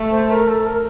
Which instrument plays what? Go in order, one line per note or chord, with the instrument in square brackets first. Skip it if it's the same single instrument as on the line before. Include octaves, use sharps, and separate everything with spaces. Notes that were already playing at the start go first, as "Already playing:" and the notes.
Already playing: [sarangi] A3
[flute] C5
A#4
A4
A#4